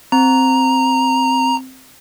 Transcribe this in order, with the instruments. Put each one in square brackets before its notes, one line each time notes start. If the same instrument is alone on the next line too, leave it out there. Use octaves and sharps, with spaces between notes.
[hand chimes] C4 [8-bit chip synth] A#5